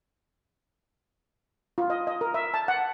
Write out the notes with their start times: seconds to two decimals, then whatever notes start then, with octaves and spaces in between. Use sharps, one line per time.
1.78 F4
1.90 D#5
2.07 D#5
2.21 A#4
2.34 E5
2.54 A5
2.68 F#5